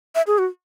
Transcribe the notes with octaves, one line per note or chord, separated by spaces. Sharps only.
E5
G#4
F#4